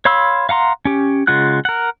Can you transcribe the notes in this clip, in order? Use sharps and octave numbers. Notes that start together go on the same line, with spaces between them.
C#5 F5 B5 C6 E6
F5 F#5 A#5 C6
C#4 G4
C#3 G#3 F4 F#5 F#6
A#4 F#5